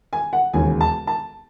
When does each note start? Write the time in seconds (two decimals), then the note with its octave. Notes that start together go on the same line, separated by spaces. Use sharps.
0.13 G#5
0.33 F#5
0.53 E1 D#2 C#3 G#5
0.81 A5
1.07 A5